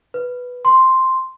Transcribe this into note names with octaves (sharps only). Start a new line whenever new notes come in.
B4
C6